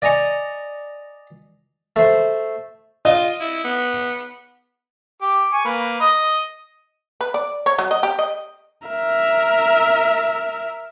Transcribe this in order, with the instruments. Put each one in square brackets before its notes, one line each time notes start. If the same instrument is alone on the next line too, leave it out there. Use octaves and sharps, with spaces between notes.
[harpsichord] D5 D#5 G#5 A#5 C#6
A3 C5
[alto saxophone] F4 [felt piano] D#5
[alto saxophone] E4
B3
[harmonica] G4 D6
G#5 C#6
A#3 B4
D#5
[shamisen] B4
D5
C#5
F#3
D#5
G4
D#5
[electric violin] A#4 E5